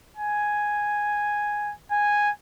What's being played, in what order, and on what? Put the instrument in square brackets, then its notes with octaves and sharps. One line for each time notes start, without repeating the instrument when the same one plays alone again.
[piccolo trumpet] G#5
G#5